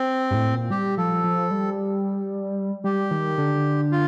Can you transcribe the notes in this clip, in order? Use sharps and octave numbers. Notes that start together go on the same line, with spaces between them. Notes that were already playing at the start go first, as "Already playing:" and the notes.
Already playing: C4
G2
A2
A#2
G3 G4
F3 A4
F3
G3
G3 G4
D#3
D3
F4